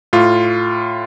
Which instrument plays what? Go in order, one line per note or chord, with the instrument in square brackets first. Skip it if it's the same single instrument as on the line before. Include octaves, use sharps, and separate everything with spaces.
[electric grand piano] A2 F4